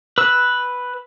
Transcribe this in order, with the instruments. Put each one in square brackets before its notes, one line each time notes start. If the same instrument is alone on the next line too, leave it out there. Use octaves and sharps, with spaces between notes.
[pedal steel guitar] B4 E6